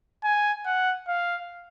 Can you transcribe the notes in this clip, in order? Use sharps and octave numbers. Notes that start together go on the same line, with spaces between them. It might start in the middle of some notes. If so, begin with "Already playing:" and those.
G#5
F#5
F5